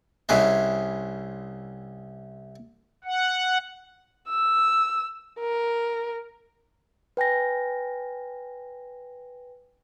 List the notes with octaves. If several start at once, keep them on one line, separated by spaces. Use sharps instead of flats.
C2 C3 C#4 G#4 B4 D#5
F#5
E6
A#4
B4 G5 G#5 A#6